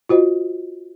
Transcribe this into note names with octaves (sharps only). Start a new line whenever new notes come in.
F4 F#4 C5 D#5